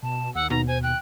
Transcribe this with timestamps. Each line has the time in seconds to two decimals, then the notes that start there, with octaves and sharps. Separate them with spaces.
0.03 B2 A5
0.35 D#2 F#5 E6
0.50 B2 D#4 A#5
0.67 C5 G#5
0.83 G5 F#6